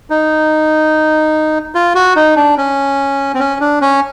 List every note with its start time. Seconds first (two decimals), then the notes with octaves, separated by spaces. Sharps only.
0.10 D#4
1.75 F4
1.95 F#4
2.16 D#4
2.36 D4
2.58 C#4
3.34 C4
3.40 C#4
3.60 D4
3.82 C#4